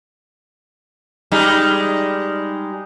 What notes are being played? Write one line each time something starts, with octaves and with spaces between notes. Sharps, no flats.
G3 G#3 D#4